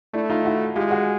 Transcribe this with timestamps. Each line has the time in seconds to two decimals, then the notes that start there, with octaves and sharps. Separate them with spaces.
0.14 A3 D4 E4
0.30 D#4 F4
0.45 E4 F#4
0.76 G#3 F4 G4
0.91 F#4 G#4